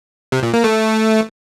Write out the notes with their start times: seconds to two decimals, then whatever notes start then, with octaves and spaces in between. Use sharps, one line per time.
0.32 C3
0.43 A#2
0.53 A#3
0.64 A3